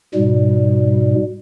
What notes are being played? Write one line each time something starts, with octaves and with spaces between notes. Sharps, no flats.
G#2 B2 G3